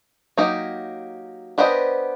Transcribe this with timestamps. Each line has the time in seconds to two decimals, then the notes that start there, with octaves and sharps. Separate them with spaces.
0.37 F#3 A#3 D#4 G4
1.58 B3 D4 G4 C5 D#5